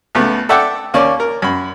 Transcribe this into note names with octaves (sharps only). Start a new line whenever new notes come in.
C#2 A3 B3
A4 D5 E5 F#5 G5 D6
D#2 A#3 C#4 D5 C#6
A#4
F#2 B5